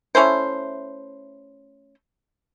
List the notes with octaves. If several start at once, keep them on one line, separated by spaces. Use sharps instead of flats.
A3 C#4 E4 C5